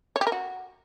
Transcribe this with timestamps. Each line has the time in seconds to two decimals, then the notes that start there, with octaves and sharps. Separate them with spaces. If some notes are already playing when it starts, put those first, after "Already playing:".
0.16 C#5
0.21 G4
0.27 A#4
0.32 F#4